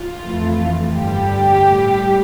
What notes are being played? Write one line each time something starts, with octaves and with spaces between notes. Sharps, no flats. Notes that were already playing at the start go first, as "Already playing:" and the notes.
Already playing: F4
F2 E3 A3
G2 D3 G3 G4
A2 G3